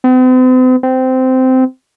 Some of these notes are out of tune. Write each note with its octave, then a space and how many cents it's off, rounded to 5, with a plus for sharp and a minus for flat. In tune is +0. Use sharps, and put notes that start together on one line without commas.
C4 -45
C4 -15